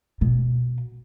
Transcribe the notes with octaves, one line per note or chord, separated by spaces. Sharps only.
B2